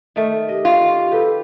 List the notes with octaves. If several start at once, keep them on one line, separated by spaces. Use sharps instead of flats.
D#3 A3
G4 D#5
F4
G4 A4 B4